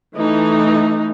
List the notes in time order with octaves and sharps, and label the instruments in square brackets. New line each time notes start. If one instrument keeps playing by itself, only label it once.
[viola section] E3 A3 D#4